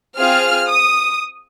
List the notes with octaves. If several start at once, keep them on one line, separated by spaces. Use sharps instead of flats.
C4 F4 G#4 F6
D#6